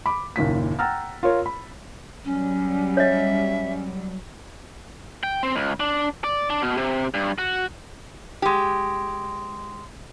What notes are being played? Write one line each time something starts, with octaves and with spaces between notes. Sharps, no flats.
B5 D6
F#1 D#2 A#2 B6
F#5 G5 A#5 E6 F6 A6
F4 A#4 C#5
B5
F#3 G3 C#4
C#5 D#5 E5
G5
C4
C#2
D4
D5
D4
B2
C3
G2
F#4
G#3 G4